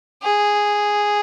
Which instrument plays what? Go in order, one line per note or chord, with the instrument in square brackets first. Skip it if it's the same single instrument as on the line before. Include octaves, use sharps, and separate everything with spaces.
[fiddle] G#4